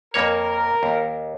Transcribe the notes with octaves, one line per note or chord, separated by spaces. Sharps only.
F2 A#3 A#4 C#5
D#2